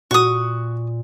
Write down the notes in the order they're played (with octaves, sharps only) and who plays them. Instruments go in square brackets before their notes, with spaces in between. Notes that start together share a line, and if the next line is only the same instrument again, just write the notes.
[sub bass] A#2 [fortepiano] F#4 [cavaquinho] C#6 D#6